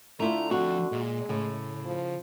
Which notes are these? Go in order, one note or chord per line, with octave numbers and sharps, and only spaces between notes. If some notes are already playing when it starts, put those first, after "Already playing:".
D3 A3 E4 F4 A#5
F3 C4 F#4
A#2 G#3
A2 C#3
F3